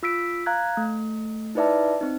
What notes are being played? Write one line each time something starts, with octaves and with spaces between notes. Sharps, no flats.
F4 E6 B6 D7
F5 A#5 F#6 G#6
A3
D#4 E4 B4 D5 E5 A5
C4 D#4